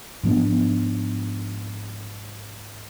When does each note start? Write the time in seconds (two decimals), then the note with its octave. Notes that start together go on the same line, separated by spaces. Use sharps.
0.23 G#2 F3 B3 D4